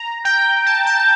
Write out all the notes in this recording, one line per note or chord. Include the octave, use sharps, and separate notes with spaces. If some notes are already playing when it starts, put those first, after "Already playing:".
Already playing: A#5
G5 G6
A5
A5